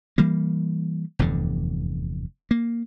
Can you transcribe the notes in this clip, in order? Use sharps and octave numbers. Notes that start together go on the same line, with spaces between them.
E3 G3 A#3
F1 E2 G2 D3
A#3